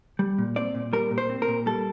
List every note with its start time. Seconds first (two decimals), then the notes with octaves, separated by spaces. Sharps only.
0.19 G3
0.38 A#2
0.56 C4 D5
0.75 A#2
0.93 G3 A#4
1.11 A#2
1.18 C5
1.29 C4
1.42 A#4
1.48 A#2
1.66 G3 A4